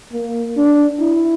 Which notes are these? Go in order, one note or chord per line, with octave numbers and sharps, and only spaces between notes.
A#3
D4
E4